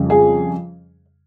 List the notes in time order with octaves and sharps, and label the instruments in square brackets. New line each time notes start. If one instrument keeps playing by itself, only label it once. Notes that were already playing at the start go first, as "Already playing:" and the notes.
Already playing: [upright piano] F2 C#3 G3
G#4